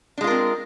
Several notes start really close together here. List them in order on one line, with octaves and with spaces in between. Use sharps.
D4 G#3 F4 A#4 C4